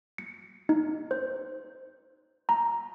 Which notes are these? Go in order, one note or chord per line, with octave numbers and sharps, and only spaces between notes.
C#7
D#4
C5
A#5